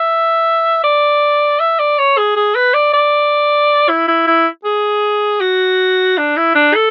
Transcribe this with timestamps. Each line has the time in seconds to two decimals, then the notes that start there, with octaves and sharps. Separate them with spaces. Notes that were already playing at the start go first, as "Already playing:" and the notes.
Already playing: E5
0.84 D5
1.60 E5
1.80 D5
1.99 C#5
2.18 G#4
2.36 G#4
2.55 B4
2.74 D5
2.93 D5
3.89 E4
4.08 E4
4.27 E4
4.65 G#4
5.40 F#4
6.18 D4
6.37 E4
6.55 D4
6.75 A4